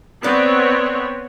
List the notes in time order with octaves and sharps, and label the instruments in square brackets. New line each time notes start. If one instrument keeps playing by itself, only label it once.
[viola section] B3 C4 C#5 [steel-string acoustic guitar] A4 D5